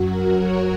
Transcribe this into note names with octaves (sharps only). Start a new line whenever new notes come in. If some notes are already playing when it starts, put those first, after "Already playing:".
Already playing: F#2 F#3 F#4
A#4
C#5